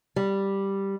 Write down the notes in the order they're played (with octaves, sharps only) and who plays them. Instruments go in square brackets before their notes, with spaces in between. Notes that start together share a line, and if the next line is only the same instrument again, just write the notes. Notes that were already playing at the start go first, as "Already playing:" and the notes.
[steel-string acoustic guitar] G3